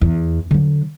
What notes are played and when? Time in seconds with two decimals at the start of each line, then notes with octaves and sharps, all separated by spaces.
0.01 E2
0.51 D3 F#3